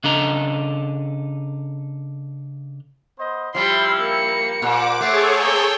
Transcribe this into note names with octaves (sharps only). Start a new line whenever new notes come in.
C#3 D4 A4 D#5 A#5
B3 C5 D#5
F3 G3 E4 C6
A#3 C#7
A#2 C5 F#5 D6
A3 G#4 A4 C#5 D6 C7
A#3 C4 G5